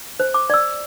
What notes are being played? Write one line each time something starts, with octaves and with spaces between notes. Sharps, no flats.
C5
D6
D5 E6